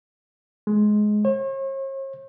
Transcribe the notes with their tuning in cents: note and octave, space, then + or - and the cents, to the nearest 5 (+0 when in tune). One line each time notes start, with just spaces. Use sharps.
G#3 +15
C#5 -45